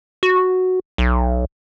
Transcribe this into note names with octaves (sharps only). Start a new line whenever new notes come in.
F#4
B1